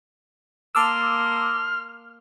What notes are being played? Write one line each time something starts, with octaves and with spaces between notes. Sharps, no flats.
A#3 A5 C6 D6 E6 F6